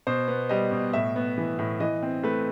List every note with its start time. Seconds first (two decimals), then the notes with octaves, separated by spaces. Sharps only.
0.07 B2 C5
0.28 B3
0.49 G3 D#5
0.71 B2
0.93 A2 E5
1.16 B3
1.38 E3
1.59 A2
1.80 E3 D#5
2.03 C4
2.23 A3 B4